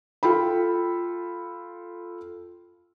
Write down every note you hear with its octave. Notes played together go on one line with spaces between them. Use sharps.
F4 A4 G5 B5